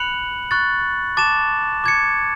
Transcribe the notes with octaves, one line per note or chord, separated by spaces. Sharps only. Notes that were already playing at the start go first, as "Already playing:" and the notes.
Already playing: B5 F#6 C#7 F#7
C#6 F#6 A6
A5 D6 A6 E7
D6 G#6 C#7